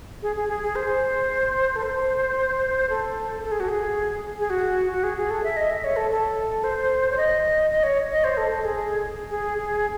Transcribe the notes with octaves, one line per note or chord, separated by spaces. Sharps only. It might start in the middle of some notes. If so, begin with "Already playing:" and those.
G#4
G#4
G#4
G#4
C5
A4
C5
A4
A4
G#4
F#4
G#4
G#4
F#4
F#4
G#4
G#4
A4
E5
D#5
E5
C#5
A4
A4
C5
C#5
D#5
D#5
C#5
D#5
C5
A4
A4
G#4
G#4
G#4